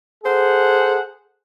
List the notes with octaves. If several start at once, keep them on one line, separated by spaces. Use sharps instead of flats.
G#4 A4 C5 F#5